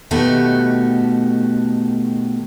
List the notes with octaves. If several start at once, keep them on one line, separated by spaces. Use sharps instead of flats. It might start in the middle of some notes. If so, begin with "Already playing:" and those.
B2 D#3 A3 F#4 G4